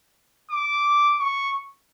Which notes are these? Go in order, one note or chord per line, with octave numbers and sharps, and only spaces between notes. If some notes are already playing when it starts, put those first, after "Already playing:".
D6
C#6